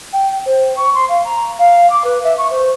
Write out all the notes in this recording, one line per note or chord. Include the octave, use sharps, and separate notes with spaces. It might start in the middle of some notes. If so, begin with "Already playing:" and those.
G5
C5
C#6
C6
F5
A#5
F5
D6
B4
E5
C#6
C5